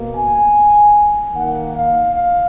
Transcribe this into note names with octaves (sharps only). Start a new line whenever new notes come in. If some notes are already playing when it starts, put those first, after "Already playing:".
Already playing: B2 A#3
G#5
D#3 A#3 F#5
F5
F5